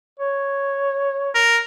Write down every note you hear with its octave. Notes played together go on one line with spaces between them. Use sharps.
C#5
A#4